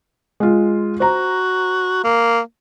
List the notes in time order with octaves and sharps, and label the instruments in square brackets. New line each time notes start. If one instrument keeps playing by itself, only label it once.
[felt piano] G#3 F4
[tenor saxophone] F#4 [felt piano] C5 A#5
[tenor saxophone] A#3